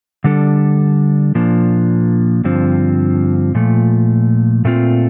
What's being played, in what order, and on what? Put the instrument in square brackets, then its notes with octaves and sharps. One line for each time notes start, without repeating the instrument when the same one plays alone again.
[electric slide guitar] D3 G3 D4 A4
A#2 F3 A#3 D4
G2 D3 F3 C4
A#2 F3 A3
A#2 A3 C4 F4